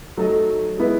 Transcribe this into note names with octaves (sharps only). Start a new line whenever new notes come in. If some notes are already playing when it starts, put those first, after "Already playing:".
F#3 A3 D#4 A4 D#5
G#3 B3 E4 B4